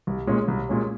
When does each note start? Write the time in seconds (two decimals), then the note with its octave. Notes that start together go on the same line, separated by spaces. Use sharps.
0.07 C2
0.27 A#2 G#3 C#4
0.48 C2
0.69 A#2 G#3 C#4